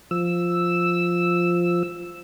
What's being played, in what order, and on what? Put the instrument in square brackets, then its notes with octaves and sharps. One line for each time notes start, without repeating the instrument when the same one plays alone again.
[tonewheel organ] F3 E6